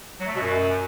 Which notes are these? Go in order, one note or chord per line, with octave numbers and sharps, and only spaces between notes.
F#3
A3
B2
F#2